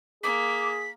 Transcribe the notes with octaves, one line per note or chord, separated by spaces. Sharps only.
A#3 G#4 D6 B6